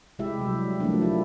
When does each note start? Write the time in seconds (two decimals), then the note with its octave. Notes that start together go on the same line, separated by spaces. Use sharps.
0.19 C3 G#3 E4 G4 E5
0.41 F#3 G3
0.80 F3 F#3 A3 A#3 D4
1.02 E4 G4